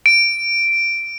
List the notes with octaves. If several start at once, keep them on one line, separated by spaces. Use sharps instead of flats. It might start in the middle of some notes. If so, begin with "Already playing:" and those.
D7